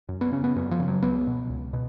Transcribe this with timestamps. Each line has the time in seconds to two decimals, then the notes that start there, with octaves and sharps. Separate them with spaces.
0.09 F#2
0.21 B3
0.32 C#3 C#4
0.44 B3
0.56 F#2 B3
0.71 F3
0.80 C#3
0.88 F#3
1.02 C#2 B3
1.27 B2
1.50 C#2
1.73 B2